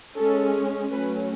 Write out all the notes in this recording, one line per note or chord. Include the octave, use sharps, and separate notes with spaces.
G#3 C#4 A4
F#3 A3 C#4 B4